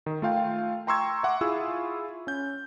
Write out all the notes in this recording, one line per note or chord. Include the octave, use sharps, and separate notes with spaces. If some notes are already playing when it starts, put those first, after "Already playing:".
D#3
A3 F4 F5 G5
G5 A#5 C6 C#6 E6 G#6
E5 F#5 C6 D6
E4 F4 G#4 C#6 E6
C#4 G6